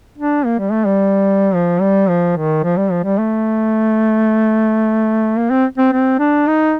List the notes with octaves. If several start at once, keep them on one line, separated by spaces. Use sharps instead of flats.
D4
A#3
G3
A3
G3
F3
G3
F3
D#3
F3
G3
F3
G3
A3
A#3
C4
C4
C4
D4
D#4